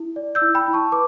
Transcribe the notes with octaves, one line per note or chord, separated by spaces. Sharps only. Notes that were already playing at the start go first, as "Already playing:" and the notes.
Already playing: E4
D5
E6 G6
E4
G5 B5
E4
A5 C#6
B4 D6